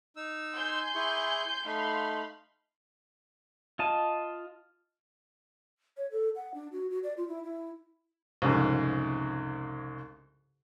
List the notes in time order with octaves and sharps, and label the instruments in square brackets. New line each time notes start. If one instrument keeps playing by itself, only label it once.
[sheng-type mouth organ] D#4 E6
[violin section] G#5 C6 G6
[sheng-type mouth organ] E4 G#4 C#6
[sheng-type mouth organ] A3 D#4 [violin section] F5 B5 C6
[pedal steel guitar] F4 D#5 A5
[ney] C#5
A4
F#5
D4
F#4
F#4
D5
F4
E4
E4
[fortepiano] C2 F2 G#2 C#3